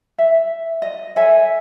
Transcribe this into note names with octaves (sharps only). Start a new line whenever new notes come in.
E5
D#5
A4 C#5 E5 G#5